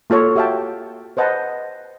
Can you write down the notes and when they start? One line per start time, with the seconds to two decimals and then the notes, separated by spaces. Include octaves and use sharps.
0.10 A#3 F4 A4 C#5
0.36 F#4 G4 E5 F5 G5 A5
1.17 B4 C5 D#5 F#5 A5